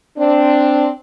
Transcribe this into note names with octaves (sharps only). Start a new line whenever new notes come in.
C4 D4